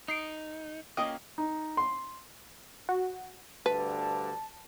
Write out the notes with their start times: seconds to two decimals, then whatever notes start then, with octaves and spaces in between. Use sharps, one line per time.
0.08 D#4 D#6 C7 D7
0.97 A#3 C#4 F4 D#5 G5
1.38 D#4
1.77 C6
2.89 F#4
3.66 D2 G2 D3 B4 A5